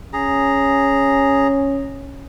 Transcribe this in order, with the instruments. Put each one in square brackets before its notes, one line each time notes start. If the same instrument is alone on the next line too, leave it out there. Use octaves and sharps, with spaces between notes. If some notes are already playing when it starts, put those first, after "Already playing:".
[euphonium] C#4 [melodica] G#4 A#5